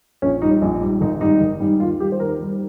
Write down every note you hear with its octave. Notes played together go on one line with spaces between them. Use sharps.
A#1 C#4
G#2 G3 D#4
A#1
G#2 G3
G#1 D#4
G#2 G3 D#4
G#1
G#2 G3
D#2 F4
D#3 G3 G4
C5
D#2 A#4
D#3 G3